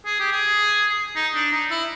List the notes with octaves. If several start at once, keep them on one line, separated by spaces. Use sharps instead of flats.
G#4
G4
G#4
D#4
D4
D#4
E4